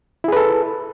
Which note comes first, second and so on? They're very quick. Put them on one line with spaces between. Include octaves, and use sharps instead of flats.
E4 G#4 B4 A4